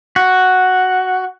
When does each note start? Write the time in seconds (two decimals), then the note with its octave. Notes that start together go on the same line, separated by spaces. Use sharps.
0.16 F#4